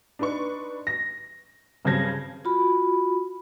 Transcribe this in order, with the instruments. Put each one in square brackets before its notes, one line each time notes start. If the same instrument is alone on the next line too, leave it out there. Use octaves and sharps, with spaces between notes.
[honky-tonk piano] D4 D#4 B4 C6 C#6
A#6
G2 C#3 C4 A5 G#6 A#6
[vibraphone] F4 F#4 B5